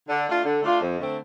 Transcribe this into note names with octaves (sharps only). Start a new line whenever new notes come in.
D3
A3 D4 F4
D3
A3 D4 F4
F2
D3 A3 C4